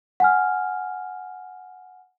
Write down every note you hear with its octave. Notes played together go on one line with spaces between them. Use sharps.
F#5 G#5 F6